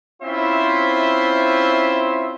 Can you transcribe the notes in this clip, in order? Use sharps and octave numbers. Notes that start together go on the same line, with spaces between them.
C4 C#4 E4 F4 C5 E5